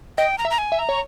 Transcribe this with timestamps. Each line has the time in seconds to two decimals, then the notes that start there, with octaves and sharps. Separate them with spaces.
0.18 D#5 G5
0.38 A#5
0.45 E5
0.50 A#5
0.58 G#5
0.72 E5
0.79 A#5
0.89 C#5